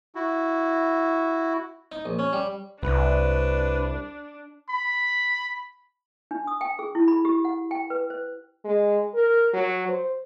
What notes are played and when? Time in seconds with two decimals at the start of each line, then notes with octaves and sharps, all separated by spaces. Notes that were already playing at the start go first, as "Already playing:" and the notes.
0.15 E4 F#4
1.92 D#4
2.06 A#1
2.19 C#4
2.33 G3
2.83 C2 D4 B4
4.70 B5
6.31 D4
6.47 D#6
6.61 G5
6.79 G#4
6.95 E4
7.08 B5
7.25 G4
7.45 F#5
7.71 G5
7.90 B4
8.10 C5
8.65 G#3
9.14 A#4
9.54 F#3
9.88 C5